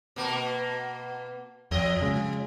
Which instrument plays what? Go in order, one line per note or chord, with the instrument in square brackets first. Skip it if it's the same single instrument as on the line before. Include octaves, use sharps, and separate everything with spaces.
[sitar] B2 A#3
[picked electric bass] F2 [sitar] F3 D#5
[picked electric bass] C#3 G#3